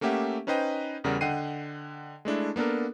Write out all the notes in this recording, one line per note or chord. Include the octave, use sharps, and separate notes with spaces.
A3 A#3 C#4 G4 E5 F#5
C#4 D#4 B4 C5 D#5 G5
E2 C#3 G3 A#4 D5 F#5
D3 D#5 F#5 G5 C7 D#7
G#3 A3 D4 E4
A#3 B3 D4 A4 A#4